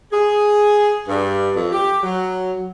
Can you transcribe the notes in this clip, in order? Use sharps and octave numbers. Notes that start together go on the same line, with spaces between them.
G#4
G2
F2
G4
F#3